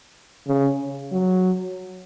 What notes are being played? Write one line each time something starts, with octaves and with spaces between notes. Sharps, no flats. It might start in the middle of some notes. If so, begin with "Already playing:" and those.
C#3
F#3